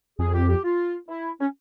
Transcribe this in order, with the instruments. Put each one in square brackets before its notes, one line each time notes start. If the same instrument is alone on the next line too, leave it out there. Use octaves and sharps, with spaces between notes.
[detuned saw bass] F2 [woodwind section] G#4
[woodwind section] G4
G4
F4
E4
C#4